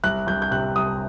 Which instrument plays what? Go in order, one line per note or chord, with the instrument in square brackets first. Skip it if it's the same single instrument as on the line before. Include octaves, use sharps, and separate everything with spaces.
[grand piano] C2 F#6
C2 G6
G6
C3 F#6
C2 D#6